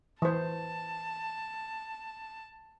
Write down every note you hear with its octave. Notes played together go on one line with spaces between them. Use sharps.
E3 C5 A5